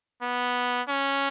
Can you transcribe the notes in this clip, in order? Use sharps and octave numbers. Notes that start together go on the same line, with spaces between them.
B3
C#4